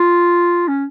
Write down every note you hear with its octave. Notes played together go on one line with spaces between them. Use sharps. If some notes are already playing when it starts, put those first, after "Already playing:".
Already playing: F4
C#4